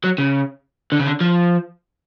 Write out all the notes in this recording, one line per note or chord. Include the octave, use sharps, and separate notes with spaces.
F#3
C#3
D3
C#3
D3
F3